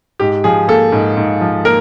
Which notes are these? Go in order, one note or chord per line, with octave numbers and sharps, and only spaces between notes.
G#2 G4
F3 G#4
A#3 A4
G#2
G#2
F3
A#3 A#4